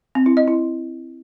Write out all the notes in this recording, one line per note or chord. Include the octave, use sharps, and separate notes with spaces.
C4
E4
D#5
E4